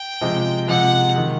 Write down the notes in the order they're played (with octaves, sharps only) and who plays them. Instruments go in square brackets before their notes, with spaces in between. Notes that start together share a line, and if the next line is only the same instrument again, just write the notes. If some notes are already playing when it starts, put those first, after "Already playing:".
Already playing: [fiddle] G5
[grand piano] C3 F3 G#3
[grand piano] C3 F3 G#3 [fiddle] F#5
[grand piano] D#3 G#3